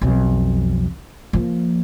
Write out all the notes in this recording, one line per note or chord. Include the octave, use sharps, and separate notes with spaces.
B1 F2
F3 A#3